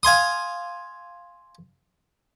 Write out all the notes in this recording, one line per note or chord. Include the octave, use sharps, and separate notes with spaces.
F5 G#5 C6 D#6